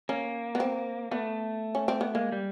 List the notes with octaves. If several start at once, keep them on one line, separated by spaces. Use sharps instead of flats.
A#3 C#4
B3
C4
A3 B3
C#4
C4
B3
G#3 A#3
G3